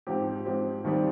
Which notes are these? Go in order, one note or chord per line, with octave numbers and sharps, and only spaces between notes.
G#2 F3 C4 G4
G#2 F3 C4 G4
D#2 D#3 G3 C4 G4